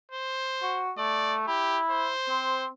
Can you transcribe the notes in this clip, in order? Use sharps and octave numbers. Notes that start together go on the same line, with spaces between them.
C5
F#4
A3 D5
E4 G4
C5
C4